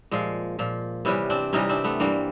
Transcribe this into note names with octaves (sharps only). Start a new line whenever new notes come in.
A#2 F3 G#3
A#2 F3
C3 E3 G3 B3 C#4
C4 D4
C3 E3 G3 C#4 D#4
C4 D4
A3 B3
G2 E3 G3 A#3 C4